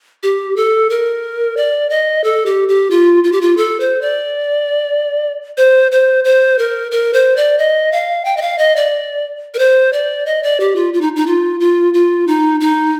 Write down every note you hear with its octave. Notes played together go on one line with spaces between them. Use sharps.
G4
A4
A#4
D5
D#5
A4
G4
G4
F4
F4
G4
F4
A4
C5
D5
C5
C5
C5
A#4
A#4
C5
D5
D#5
F5
G5
D#5
F5
D#5
D5
A#4
C5
D5
D#5
D5
G4
F4
F4
D#4
D#4
F4
F4
F4
D#4
D#4